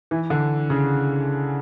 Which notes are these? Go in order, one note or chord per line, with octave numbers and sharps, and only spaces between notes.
E3
D3
C#3